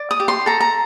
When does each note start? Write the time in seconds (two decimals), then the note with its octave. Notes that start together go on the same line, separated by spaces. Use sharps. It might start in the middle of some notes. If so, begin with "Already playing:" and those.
Already playing: D5
0.11 D#6
0.20 G4
0.28 C6
0.46 A4 A#5
0.60 A#5